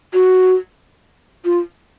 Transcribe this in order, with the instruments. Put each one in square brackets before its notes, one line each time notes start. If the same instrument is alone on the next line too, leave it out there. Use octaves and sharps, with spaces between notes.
[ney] F#4
F4